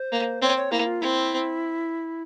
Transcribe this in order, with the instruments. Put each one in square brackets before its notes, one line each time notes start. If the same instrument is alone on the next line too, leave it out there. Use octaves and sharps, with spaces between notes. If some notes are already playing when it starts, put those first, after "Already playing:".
Already playing: [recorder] C5
[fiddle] A#3
[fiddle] C4 [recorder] C#5
[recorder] C#5
[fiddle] A#3 [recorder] E4
[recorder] F4
[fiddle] C4 [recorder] E4